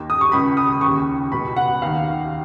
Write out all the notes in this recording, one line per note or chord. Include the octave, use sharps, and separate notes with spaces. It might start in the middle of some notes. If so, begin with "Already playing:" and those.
Already playing: D#2 D#3
D#6
C#6
C#2 C#3 B5
D#6
D#2 C#3 C#6
C#2 B2 B5
F#5
D#2 D#3 F5